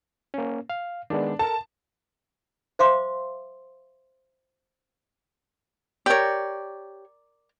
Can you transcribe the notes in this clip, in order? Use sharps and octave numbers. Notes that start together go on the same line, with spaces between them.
A#3 C#4
F5
D#3 G#3 B3 D4
A4 A#4 A5
C5 E5 F5 C6 D6
G4 A#4 C#5 D5